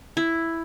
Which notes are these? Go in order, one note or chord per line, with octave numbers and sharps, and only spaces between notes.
E4